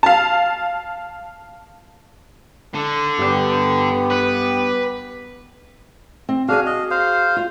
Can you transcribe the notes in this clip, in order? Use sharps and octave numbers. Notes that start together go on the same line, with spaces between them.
F5 A5
D3
G2 B3 G4
B4
C4
D4 F#4 G#4 F5 G#5
D#5
C5 F5
F4 F5